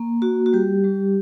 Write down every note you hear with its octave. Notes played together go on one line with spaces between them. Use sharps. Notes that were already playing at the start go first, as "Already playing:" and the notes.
Already playing: A#3
F#4
F#4
G3 G4
G3